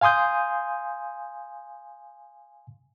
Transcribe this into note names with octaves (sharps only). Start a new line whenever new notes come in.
F5 G#5 C6 D#6 G6